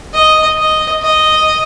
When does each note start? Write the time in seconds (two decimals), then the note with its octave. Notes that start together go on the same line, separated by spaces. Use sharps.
0.14 D#5
0.58 D#5
1.02 D#5